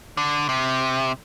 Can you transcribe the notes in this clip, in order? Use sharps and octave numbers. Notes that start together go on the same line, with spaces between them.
D3
C3